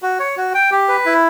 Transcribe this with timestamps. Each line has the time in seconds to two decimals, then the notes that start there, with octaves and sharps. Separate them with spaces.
0.02 F#4
0.20 C#5
0.37 F#4
0.54 G5
0.71 G4
0.88 B4
1.06 E4